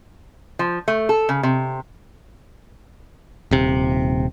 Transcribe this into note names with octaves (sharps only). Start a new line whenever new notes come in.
F3
A3
A4
C#3
C3
D#1 C3